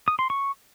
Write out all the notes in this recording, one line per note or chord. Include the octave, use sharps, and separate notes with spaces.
D#6
C6
C#6